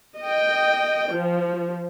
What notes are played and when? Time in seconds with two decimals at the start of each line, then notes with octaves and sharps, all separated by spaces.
0.20 D#5 G5
1.11 F3